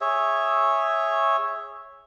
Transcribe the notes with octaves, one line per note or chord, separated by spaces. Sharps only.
G#4 C#5 E5